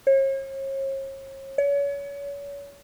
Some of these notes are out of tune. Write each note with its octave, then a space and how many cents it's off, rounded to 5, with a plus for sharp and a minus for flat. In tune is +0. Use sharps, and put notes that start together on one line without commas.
C#5 -40
C#5 +35